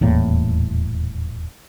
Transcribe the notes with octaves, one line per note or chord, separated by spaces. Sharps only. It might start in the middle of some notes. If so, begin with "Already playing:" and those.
D#1 E2 A2 A#3